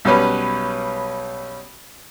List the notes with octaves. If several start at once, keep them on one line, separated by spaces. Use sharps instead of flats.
B1 G3 C#4 B4